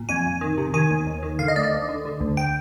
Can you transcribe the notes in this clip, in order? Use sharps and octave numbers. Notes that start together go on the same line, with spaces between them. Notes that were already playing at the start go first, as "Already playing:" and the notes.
Already playing: A#2
F2 G#5
F2
D#3
C3
D#3 G#5
D#2
D#2
D#3
D3 F5
D#5
D2 D5
D#5
D2
D3
D3
D2
G5